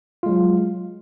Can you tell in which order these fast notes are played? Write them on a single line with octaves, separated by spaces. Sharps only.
F4 G#3 F#3